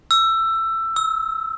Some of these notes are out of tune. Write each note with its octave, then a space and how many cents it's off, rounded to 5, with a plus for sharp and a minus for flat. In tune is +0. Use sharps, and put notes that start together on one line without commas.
E6 +15
E6 -25